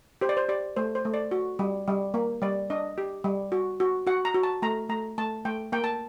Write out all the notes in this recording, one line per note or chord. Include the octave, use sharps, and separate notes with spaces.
G4 C5
D5
C5
G4 D5
A3 C5
C5
A3
D5
F#4
G3
G3
A#3
G3 D5
D4 D#5
G4
G3
F#4
F#4
F#4 F#5
A#5
F#4
A5
A3 A#5
A3 A#5
A3 A5
A3 G5
A#3 G5
A5